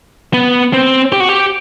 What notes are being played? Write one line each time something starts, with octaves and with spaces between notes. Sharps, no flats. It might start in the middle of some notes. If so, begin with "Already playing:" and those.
B3
C4
G4
F#4
G4